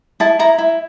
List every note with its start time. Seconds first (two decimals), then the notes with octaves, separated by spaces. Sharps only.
0.20 E4 A5
0.39 E4 A#5
0.58 E4